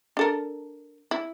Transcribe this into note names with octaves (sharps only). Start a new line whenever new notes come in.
D4 A4 A#4
E4